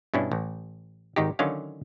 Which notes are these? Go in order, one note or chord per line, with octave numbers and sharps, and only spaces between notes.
G2 B2 C#4 D4 E4
A1
G#1 D#3 D#4 G4
D3 D#3 F#3 C#4 F5